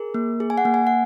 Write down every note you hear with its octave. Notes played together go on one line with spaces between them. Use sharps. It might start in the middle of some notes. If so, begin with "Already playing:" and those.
Already playing: G#4 A#4
A#3
G#4
G#5
F#5
A#3
G#5
F#5